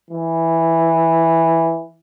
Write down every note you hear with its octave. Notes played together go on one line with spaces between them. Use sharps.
E3